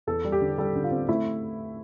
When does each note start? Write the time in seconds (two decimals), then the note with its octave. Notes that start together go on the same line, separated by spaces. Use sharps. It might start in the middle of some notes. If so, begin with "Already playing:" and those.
0.07 E2 A4
0.24 G3
0.32 G4
0.41 D3
0.58 G3 A4
0.75 D3
0.84 F4
0.91 C4
1.09 A3 E4